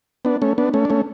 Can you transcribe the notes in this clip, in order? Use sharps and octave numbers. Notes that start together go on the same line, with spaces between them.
B3 D4
A3 C#4
B3 D4
A3 C#4
D4
A3 C#4